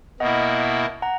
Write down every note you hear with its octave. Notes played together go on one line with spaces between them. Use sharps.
B2 A#3 E4 D#5 F#5
F#5 A#5